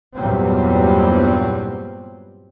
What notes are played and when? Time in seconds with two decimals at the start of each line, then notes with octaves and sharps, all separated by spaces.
0.15 E2 G2 A#2 F#3 G3 C4